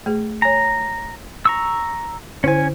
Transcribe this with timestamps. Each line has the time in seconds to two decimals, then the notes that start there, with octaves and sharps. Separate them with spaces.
0.06 A3 G#4
0.42 C#5 G#5 A#5
1.45 A#5 C#6 E6
2.44 D3 C#4 E4 C5 G#5